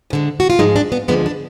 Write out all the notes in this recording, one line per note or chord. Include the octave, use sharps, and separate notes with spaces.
D2 D3 G#3
F#4
F4
G#2 F3 G#3 D#4
D4
B3
D2 D3 F3 G#3 B3
D4